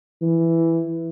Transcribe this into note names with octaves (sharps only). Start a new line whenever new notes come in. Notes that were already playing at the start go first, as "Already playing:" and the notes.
E3